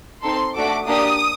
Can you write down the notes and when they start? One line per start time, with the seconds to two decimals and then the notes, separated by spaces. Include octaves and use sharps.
0.24 C4 D#4 A4 C6
0.55 A3 D4 F#4 A4 D6
0.87 A#3 D4 G4 D#6